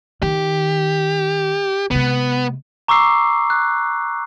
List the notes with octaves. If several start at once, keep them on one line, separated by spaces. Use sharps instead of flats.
D#3 G4
C3 G#3 B3
A#5 C#6 D6 E6 C7
F#6